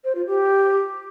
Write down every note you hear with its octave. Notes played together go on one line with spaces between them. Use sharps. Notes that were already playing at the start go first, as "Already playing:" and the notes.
C5
F4
G4